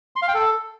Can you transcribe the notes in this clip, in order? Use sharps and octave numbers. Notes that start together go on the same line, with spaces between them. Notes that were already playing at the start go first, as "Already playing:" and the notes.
C6
F5
G5
A4